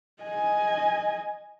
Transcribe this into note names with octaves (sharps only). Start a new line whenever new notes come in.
D#5 G#5